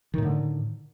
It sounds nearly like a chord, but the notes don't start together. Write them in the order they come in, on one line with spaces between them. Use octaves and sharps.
D#3 A2 D3